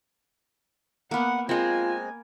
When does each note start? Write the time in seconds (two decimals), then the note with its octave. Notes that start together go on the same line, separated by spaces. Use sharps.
1.11 A#3 B3 F#5
1.49 G#3 A#3 C4 F4 G#5